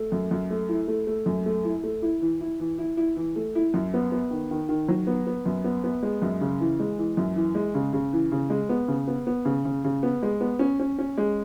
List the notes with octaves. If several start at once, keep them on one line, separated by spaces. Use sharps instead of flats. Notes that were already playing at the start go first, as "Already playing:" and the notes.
Already playing: A3
F#2
F#2
A3
E4
A3
A3
F#2
A3
E4
A3
E4
E3
E4
E3
E4
E4
E3
A3
E4
F#2
B3
B3
D#3
D#3
D#3
F#3
B3
B3
F#2
B3
B3
G#3
F#2
C#3
E3
G#3
E3
F#2
E3
G#3
C#3
C#3
E3
C#3
G#3
B3
C#3
B3
B3
C#3
C#3
C#3
B3
G#3
B3
C#4
C#4
C#4
G#3